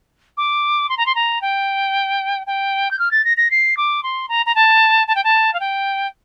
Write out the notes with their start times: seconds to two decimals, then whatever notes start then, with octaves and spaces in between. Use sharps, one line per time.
0.37 D6
0.89 C6
0.97 A#5
1.06 C6
1.15 A#5
1.41 G5
2.46 G5
2.91 G6
2.99 F6
3.11 A6
3.24 A#6
3.37 A#6
3.50 C7
3.77 D6
4.03 C6
4.28 A#5
4.46 A#5
4.55 A5
5.07 A5
5.15 G5
5.24 A5
5.53 F5
5.60 G5